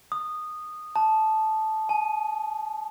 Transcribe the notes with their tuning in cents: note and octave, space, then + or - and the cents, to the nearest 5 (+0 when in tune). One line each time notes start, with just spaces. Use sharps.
D#6 -15
A5 -10
G#5 +35